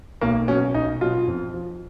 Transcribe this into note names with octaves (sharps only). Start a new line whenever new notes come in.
B1 A#3
B2 F#3 C#4
B1 D#4
B2 F#3 F4
F2
F3